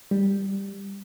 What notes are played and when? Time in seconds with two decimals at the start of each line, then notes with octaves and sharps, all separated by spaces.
0.11 G3